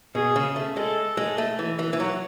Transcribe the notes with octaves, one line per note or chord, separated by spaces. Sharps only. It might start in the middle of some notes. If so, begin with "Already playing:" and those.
B2 G#4
C#3
A3
G#3 A4
G#3
A3
E3
E3
E3
F#3